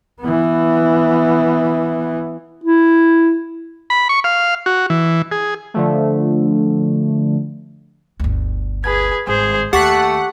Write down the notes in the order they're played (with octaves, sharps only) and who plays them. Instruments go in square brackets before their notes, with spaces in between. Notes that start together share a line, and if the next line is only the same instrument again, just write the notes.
[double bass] E3 B3
[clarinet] E4
[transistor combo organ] B5
C#6
F5
F#4
E3
G#4
[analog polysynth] D3 F3 A3
[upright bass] G1 D2
[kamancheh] G#4 B4 [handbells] G#6
[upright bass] G#1 G2 [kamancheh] G#4 C5
[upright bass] D#2 [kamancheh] A3 [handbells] G4 C#6 B6 [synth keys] F#5